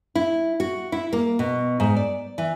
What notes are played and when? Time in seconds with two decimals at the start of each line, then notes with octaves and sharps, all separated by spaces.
0.15 E4
0.60 F#4
0.92 E4
1.13 A#3
1.39 B2
1.80 G#2
1.96 D5
2.38 E3